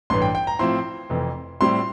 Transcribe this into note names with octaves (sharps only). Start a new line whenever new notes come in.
A1 G2 E3 C6
G5
G5
A#5
A2 F3 C4 E4 C6
F1 F2 E3
A2 G3 C4 E4 C6